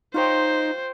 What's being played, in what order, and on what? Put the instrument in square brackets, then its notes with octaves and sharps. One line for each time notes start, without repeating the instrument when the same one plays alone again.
[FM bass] D#4 [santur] F4 C#5 G5 [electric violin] C5